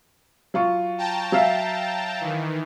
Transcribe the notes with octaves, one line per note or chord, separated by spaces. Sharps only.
F#3 F4 C#6
G5 A5 A#5
F#3 E5 F5
D#3 E3